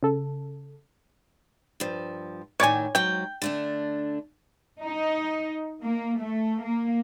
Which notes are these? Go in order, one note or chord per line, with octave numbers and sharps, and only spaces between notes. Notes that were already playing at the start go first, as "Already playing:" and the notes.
C#3 A4
G2 F3
A2 D#3 C#5 D5 G#5
G#2 F#3 G5
D3 A3 D4
D#4
A#3
A3
A#3